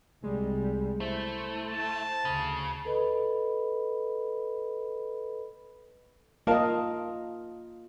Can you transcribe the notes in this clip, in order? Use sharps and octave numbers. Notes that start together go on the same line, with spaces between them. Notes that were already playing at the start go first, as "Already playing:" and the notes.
C2 G3 G#3
A3 E4 C5
A5
D2 C#3
A4 B4 D#5 B5
A#3 F4 A#4 D#5 F5 A5